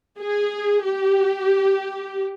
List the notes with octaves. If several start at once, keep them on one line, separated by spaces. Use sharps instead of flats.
G#4
G4